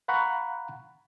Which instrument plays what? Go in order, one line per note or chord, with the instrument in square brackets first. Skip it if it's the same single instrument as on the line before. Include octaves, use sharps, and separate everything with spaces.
[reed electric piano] F5 F#5 A#5 B5 C#6 F#6